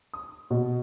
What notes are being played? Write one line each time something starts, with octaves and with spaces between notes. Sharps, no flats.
D#6
B2